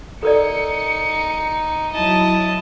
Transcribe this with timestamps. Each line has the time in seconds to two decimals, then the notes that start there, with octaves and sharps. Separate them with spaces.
0.23 D#4 A4 A#4 D5 C#7
1.92 F#3 E4 D#5 A5